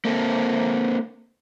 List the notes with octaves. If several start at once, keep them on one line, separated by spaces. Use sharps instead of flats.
A#3 C4 A4